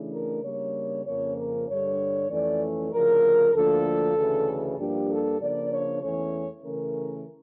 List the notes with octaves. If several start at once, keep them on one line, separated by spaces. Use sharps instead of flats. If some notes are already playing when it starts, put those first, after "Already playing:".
Already playing: C#3 E3 A3 D4
A#4
C#3 G3 A#3 D4 C#5
F2 C#3 F3 A#3 C#4 C#5
A#4
G2 D3 G3 D4 C#5
F2 E3 A3 C#4 D5
D2 C#3 F3 A#4
D2 D3 F3 A#3 D4 A4
D2 C#3 E3
G2 F3 A#3 D4 G4
A4
C#3 F3 A#3 D4 D5
C#5
E2 E3 A3 C#4 C#5
C#3 E3 A3 C#4 A#4